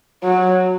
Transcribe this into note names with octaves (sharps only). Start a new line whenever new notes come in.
F#3